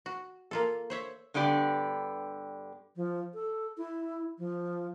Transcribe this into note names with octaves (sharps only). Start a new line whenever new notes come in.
F#4
A#3 F4 A4
C5 C#5 E5
G2 D3 B3 G4 D5
F3
A4
E4
F3